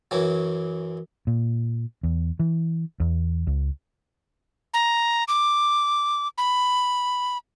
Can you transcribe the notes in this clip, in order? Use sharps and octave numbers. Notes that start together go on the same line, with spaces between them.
F#2 E3 F#3
A#2
E2
E3
E2
C#2
A#5
D6
B5